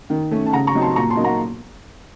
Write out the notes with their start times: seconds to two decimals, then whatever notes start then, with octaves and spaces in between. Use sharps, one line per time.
0.10 D#3
0.31 A3 C#4
0.46 A5
0.53 C#3 F#5 A#5
0.67 A#5 C#6
0.75 F#3 C4 D#4
0.81 A5 C6
0.96 A#2 A#5 C#6
1.10 A5 C6
1.17 F#3 A#3 D#4
1.24 F#5 A#5